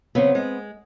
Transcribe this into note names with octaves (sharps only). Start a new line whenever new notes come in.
C#3 F#3 B3 C4
G#3